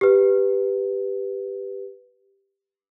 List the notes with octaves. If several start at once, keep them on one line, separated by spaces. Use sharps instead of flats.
G4 B4